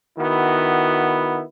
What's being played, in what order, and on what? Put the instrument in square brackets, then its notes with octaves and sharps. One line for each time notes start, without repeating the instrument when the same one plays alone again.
[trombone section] D#3 B3 E4 F#4